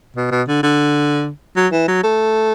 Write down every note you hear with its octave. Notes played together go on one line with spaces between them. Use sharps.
B2
B2
D3
D3
F#3
E3
F#3
A3